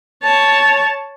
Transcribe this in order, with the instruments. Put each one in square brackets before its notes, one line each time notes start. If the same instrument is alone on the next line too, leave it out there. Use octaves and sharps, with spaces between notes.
[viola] C#5 A5